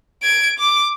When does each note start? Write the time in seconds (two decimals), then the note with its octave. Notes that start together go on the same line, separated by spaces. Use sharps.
0.24 G#6 D7
0.59 D6